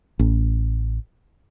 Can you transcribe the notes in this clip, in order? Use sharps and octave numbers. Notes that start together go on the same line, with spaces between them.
A1